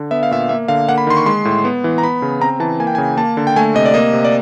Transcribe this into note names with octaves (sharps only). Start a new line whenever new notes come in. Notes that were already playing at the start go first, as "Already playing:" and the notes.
Already playing: D3
B3 E5
F5
A#2 E5
A#3 E5
D3 F5
A#3 F#5
B5
D#3 C6
C#6
G#3 C6
A2
B3
E3
A#5
B3 B5
C#3
C4 A#5
E3 A5
A#3 G#5
G5
G#5
C#3
A#3 A5
D3
G5
A3 G#5
C3 D#5
D5
A#3 D#5
C3
D5